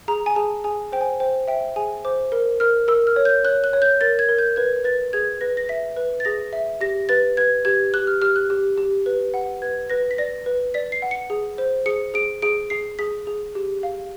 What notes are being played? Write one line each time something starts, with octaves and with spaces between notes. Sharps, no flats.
G#4 A#5
G#5
G#4 A5
G#4 G#5
C5 G5
G#5
C5 G5
E5 G5
G#4 G#5
C5 D6
A#4
A#4 F6
A#4 E6
F6
C#5
G6
C#5 F#6
F#6
C#5
G6
A#4 A6
G#6
A#4
G6
B4 G#6
B4 A6
G#4 G#6
B4 A#6
A#6
E5 B6
B4
A6
G#4 A#6
E5
G4 A#6
B4 A6
B4 G#6
G4 G#6
G4 F#6
F6
G4 F6
F#6
G4
G4
B4
F#5
B4 G#6
B4 A#6
B6
D5 A#6
B4
D5 B6
C7
F#5
C#7
G#4
C5
G#4 C#7
G#4 D7
G#4 D7
G#4 C7
G#4 B6
G#4
G4
F5